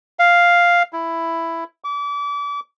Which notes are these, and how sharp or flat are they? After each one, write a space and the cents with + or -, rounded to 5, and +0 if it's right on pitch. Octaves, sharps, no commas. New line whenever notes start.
F5 +0
E4 +5
D6 -35